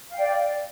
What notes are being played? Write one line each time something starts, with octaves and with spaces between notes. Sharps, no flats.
D5 F5 G5